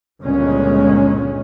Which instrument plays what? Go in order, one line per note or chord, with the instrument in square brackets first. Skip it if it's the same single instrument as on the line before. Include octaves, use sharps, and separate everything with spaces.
[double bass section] G1 C#2 A#2 G#3 C#4